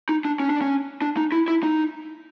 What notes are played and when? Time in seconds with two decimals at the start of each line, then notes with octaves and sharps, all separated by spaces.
0.09 D#4
0.25 D4
0.40 C#4
0.50 D4
0.61 C#4
1.02 D4
1.17 D#4
1.32 E4
1.48 E4
1.63 D#4